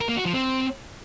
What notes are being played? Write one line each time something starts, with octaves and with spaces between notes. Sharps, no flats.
A#4
A#3
F#4
F3
C4